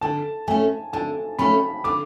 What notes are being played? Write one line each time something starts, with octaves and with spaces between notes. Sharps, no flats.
D3 A5
A3 C#4 G#5
D3 A5
A3 C#4 B5
D3 D6